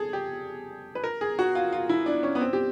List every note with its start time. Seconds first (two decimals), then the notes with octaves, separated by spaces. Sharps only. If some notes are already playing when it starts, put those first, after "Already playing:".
Already playing: G#4 A4
0.13 G4
0.95 B4
1.04 A#4
1.21 G#4
1.39 F#4
1.55 F4
1.73 F4
1.89 E4
2.06 D4
2.23 C#4
2.35 B3
2.41 C4
2.53 G4